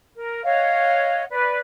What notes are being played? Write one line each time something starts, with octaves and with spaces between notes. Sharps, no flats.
A#4
C#5 D#5 F5 F#5
B4 D5